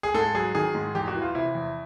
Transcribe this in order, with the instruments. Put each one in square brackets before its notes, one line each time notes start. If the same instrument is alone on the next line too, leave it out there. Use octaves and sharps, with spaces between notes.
[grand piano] G#4
G#2 A4
F#3 G#4
D#3 G#4
G#2
E2 G4
F#4
E3
F4
C3 E4
E2